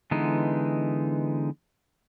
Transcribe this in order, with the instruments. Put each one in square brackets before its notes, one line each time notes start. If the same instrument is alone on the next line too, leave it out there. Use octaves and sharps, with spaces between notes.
[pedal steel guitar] D3 E3 G#3 B3 D#4